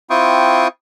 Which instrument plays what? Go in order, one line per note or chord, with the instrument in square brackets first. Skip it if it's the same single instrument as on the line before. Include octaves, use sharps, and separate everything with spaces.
[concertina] C4 E4 F4 G5 C#6 D#6